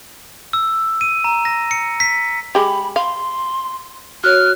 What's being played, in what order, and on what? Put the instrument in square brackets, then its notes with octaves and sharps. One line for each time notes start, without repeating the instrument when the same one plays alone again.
[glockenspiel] E6
D#7
A#5
A#6
C#7
B6
[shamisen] G#3 G4 [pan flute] B5
[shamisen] F5 [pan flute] C6
[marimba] F#4 C#5 [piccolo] F6 [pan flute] F#6